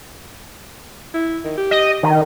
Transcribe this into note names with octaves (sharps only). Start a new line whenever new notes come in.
E4
D#3
G4
D#5
D#3